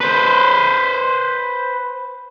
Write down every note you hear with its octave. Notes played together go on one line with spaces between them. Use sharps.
B4 C5